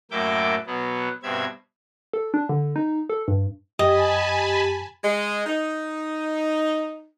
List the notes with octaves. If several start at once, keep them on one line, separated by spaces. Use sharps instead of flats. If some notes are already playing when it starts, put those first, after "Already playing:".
F#2 A2 A#3 E5 G5 D6
B2 F#3 B3
G2 B2 C4 E5 G#6
A4
D4
D3
D#4
A4
G2
F#2 G4 D#5 G#5 A5 B5
G#3
D#4